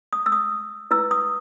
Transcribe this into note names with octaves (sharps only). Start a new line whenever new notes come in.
D#6
E6
D#6
E4 B4 E6
D#6